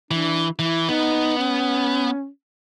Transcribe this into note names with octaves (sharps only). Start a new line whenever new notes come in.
E3 D4
E3 E4
B3 D#4
C#4